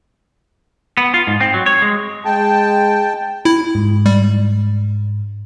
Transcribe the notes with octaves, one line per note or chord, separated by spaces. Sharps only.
B3
F4
G#2
C4
F#3
C#5
G#3
G#3 G5 A5
E4
G#2
G3